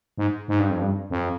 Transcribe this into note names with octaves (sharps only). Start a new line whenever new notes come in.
G#2
G#2
G2
F2
G2
F2